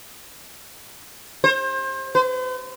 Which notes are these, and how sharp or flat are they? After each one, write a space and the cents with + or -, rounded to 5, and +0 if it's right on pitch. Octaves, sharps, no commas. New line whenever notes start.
C5 +30
C5 -45